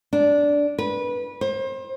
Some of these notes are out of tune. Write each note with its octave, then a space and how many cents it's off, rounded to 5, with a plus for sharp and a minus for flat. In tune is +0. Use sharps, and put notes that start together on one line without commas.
D4 -10
B4 -20
C5 +30